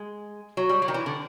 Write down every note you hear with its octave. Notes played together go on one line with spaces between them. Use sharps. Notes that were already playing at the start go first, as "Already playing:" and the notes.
Already playing: G#3
F#3
G3
F#3
D#3
E3
D3